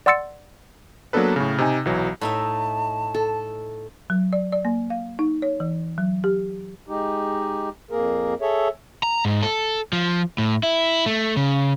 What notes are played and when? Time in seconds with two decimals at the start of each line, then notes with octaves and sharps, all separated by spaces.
0.06 D5 F#5 C6 E6 A6 C#7
1.13 F#3 A#3 B3 D4 A4 B4
1.36 A2 C#3
1.58 C3 D#4 G#5
1.85 B1 E3 F#3
2.21 A2 D#4 E5 A5
3.14 A4
4.10 F#3
4.33 D5
4.52 D5
4.65 A#3
4.90 F5
5.19 D#4
5.42 C#5
5.60 E3
5.98 F#3
6.24 G4
6.88 G#3 D#4 G4
7.91 F2 A#3 G#4 A#4
8.41 G#4 A4 C#5 E5
9.03 A#5
9.25 G#2
9.43 A4
9.93 F3
10.38 A2
10.63 E4
11.06 A3
11.37 C#3